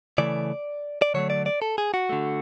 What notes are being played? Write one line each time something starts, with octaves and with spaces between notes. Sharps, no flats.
C#3 E3 A3 D5
D5
D3 F#3 A3 C#5
D5
D5
A4
G#4
F#4
D3 A3